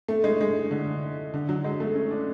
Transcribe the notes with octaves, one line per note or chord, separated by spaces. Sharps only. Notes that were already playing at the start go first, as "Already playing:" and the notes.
A3
G#3
G#3
D3
D3
F#3
G#3
A3
C#4
D4